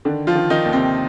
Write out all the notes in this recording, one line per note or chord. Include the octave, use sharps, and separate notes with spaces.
D3 D#3 D4
F3 F4
D#3
D#3 D#4
D#2
C3 C4